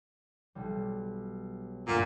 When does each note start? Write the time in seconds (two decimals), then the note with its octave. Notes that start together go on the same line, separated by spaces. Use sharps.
0.55 B1 G3
1.88 D2 G2 A#2 F#5